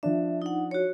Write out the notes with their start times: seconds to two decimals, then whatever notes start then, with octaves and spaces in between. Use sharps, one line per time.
0.03 F3 D4 E5
0.42 D#4 F#5
0.71 F#4 C#5